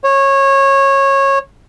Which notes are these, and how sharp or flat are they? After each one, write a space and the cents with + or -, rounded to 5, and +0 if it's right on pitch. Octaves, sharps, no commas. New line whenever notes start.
C#5 -20